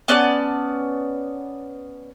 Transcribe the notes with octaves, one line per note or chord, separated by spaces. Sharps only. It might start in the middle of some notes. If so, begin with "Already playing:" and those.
B3 C#4 D5 A5